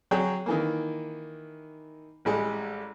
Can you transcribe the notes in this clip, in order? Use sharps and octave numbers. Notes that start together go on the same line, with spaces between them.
F#3 G#4 C#5 G5
D#3 E3 A#3
A1 G3 G#3